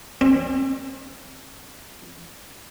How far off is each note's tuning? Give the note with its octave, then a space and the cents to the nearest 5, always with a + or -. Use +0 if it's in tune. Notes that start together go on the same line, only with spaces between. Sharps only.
C4 +45